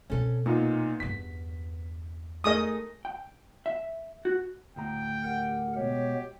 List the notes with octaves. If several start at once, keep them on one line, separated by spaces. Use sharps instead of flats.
B2 C4 C#4 A4
A#2 B3 D#4 F4
E2 G2 B6
A3 G#4 A#4 D#5 D#6
G5
E5
F#4
D2 A2 G5 A#5
G4 A#4 F#5
B2 G#3 B3 G4 C#5